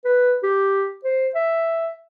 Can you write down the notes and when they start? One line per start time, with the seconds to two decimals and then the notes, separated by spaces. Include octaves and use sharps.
0.05 B4
0.43 G4
1.04 C5
1.35 E5